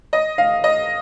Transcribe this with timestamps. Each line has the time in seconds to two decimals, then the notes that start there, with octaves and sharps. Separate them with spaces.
0.13 D#5
0.38 F5
0.64 D#5